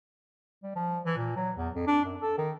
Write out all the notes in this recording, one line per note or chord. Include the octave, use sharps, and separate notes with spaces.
G3
F3
E3
A#2
F#3
E2
F2
D4
F#2
A4
D#3